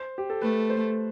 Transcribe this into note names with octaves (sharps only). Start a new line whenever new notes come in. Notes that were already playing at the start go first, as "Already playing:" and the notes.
Already playing: C5
G4
A4
A3 B4
C5